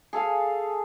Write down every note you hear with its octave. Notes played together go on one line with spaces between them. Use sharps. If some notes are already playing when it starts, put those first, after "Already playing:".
G#4 A4 F5 G#5